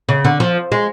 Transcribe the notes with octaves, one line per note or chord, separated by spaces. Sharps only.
C#3
D3
F3
G#3